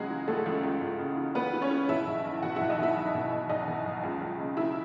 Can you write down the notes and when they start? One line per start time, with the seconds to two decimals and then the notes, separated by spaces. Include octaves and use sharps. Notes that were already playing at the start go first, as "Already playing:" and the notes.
Already playing: C#2 C#3 F#3 G#3 F#4 G#4
0.10 E3
0.28 C#2 A3 A4
0.46 C#2
0.63 C#2
0.81 C#2
0.99 C#3
1.17 E3
1.35 C#2 B3 B4
1.53 E3
1.62 C#4 C#5
1.71 E3
1.89 B2 E4 E5
2.07 B1
2.25 B1
2.42 B2 F#4 F#5
2.56 B1 E4 E5
2.69 D#4 D#5
2.78 B2 E4 E5
2.96 B1
3.14 B2
3.32 B2
3.49 B1 D#4 D#5
3.68 B2
3.86 B1
4.04 C#2
4.22 C#2
4.39 C#3
4.57 E3 E4 E5